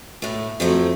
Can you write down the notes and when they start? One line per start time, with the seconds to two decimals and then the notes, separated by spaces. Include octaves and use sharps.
0.22 A2 A3
0.60 F2 F3 F#3 A3